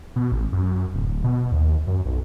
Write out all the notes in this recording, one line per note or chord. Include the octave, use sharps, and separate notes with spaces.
B2
A1
F#2
D1
B2
D#2
F#2
B1